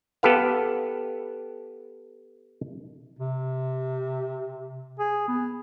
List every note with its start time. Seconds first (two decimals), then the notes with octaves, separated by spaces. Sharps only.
0.23 B3 G4 A4 B4 F5
3.19 C3
4.99 G#4
5.28 B3